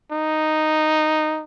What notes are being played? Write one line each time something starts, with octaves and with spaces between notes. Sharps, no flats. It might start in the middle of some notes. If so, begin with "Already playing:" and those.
D#4